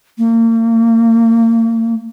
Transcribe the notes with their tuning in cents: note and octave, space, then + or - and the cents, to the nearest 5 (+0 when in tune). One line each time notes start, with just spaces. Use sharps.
A#3 -35